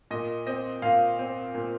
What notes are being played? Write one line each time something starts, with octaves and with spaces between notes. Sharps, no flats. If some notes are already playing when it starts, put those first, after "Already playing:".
A#2 D#5
C4 D#5
A#2 F5
C4
A#2